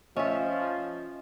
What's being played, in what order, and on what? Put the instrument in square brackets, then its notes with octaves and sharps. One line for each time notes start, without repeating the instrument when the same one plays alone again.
[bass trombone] F3 [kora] C#4 E5 [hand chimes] D#5